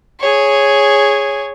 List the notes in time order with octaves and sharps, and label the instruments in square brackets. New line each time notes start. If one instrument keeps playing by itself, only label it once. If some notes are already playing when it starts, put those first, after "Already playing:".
[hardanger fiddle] G#4 C#5